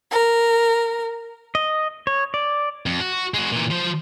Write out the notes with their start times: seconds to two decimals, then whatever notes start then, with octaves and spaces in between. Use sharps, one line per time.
0.10 A#4
1.55 D#5
2.07 C#5
2.34 D5
2.86 F2
3.00 F#4
3.34 G#3 F#4
3.52 A#2 E3
3.71 F3 C5